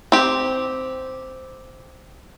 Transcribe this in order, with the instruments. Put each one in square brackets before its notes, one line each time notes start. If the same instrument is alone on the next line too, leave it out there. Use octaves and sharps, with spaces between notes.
[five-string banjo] C4 G4